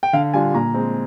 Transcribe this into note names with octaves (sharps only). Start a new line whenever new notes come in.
G5
D3 F5
G3 D4 F4 G#5
A#2 A#5
G#3 C4